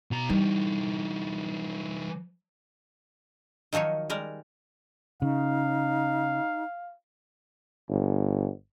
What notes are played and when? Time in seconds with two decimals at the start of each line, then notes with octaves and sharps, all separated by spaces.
0.11 B2 A#5
0.30 E3 G3 D#4
3.73 D#3 F3 F#3 D#4 C#5
4.10 G3 G#3 A#4
5.22 C#3 D#4 F5
7.89 G1